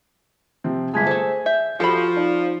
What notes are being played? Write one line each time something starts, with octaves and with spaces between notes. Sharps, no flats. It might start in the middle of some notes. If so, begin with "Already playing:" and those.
C3 F3 C4
G1 G#3 G#4 A5 G#6 B6
A3 G#4 A4 C5 G#6
E5 G6
F3 F#4 G4 A4 B5
D#4 D5